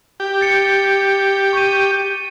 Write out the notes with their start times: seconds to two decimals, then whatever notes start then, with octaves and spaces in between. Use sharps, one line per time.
0.20 G4
0.41 A6 C#7 D7
1.53 C#6 D#7